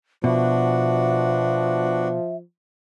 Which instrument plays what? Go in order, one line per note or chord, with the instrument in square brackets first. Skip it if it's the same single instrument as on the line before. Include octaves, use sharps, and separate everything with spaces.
[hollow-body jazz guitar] B2 [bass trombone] F3 [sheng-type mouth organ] B3 D4 F#4 [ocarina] E5